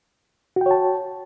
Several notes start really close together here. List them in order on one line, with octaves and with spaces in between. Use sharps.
F#4 G5 C#5 A5